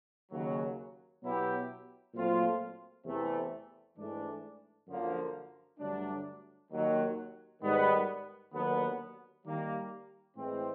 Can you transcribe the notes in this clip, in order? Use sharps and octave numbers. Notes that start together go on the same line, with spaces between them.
D#2 C#3 F#3
B2 F#3 B3 E4 G4
A#2 F#3 A3 C4 F4
E2 C3 E3 A3
G#2 E3 A3 D4
F#2 D3 F3 A#3
G2 D3 F#3 A3 D4
D#2 D#3 F#3
G#2 D#3 G3 B3
D#2 D3 F#3 B3
D#3 G3 A#3
A2 E3 G#3 C4